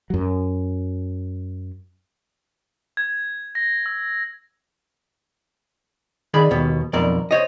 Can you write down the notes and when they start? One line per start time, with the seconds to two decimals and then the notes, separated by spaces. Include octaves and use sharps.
0.10 F#2 F#3
2.97 G#6
3.55 A#6
3.86 E6
6.34 D#3 G#4 D5 B5
6.51 D#2 B2
6.93 B1 F2 A#4 D5
7.31 C5 C#5 D#5